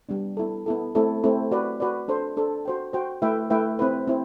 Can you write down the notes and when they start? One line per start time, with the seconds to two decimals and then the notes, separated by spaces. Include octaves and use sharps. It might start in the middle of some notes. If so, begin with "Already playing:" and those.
0.09 G3 B3 D4
0.37 B3 E4 A4
0.66 B3 E4 A4
0.95 A3 C4 E4 A4
1.23 A3 C4 E4 A4
1.51 F#4 B4 D5
1.80 F#4 B4 D5
2.08 D4 A4 C5
2.37 D4 A4 C5
2.65 F#4 C5 G5
2.93 F#4 C5 G5
3.22 A3 E4 B4 E5 G5
3.50 A3 E4 B4 E5 G5
3.79 C4 E4 B4
4.08 C4 E4